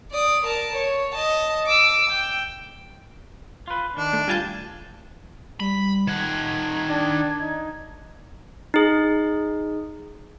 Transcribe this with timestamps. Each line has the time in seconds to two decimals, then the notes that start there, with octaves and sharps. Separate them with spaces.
0.11 D5 D#6
0.46 A#4 A5
0.76 C#5
1.13 D#5 A5
1.66 D6 E6
2.10 G5
3.68 F4 B4
3.97 D#3 D4
4.13 A3
4.28 D2 G3 F4 G#5 A5 G6
5.60 G3 B5
6.08 D#3 F#5 G#6
6.90 D4
7.41 D#4
8.74 D#4 G#4